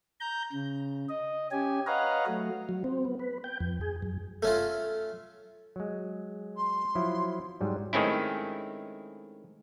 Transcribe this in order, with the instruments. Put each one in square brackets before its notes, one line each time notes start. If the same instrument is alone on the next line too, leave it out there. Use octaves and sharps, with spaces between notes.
[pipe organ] A#5 G6
C#3
D#5
C#4 G4 G#5
B4 C#5 D#5 F5 F#5 A#5
F#3 A3
[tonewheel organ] F#3
C4
B3
B4
G5
F2
G#4
F#2
[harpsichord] A3 C#4 F4
[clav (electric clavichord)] F#3 G#3
[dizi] C6
[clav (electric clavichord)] F3 F#3 E4
G#2 F#3 G3
D#3 G#3 A3 C4 C#4 E4